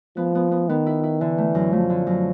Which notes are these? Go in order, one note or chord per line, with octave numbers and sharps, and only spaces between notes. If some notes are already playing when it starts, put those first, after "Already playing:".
F3 B3
B3
B3
D#3 B3
E4
E4
D3 E3
A3
F#2
F3 A3
D3
F#2